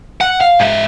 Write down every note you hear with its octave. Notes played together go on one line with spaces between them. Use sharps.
F#5
F5
G#2 E5